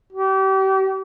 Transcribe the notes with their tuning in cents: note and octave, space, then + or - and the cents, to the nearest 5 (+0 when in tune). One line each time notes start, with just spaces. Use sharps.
G4 -35